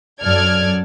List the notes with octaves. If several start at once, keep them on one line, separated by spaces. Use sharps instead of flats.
F#2 F#3 A4 D5 F6 G#6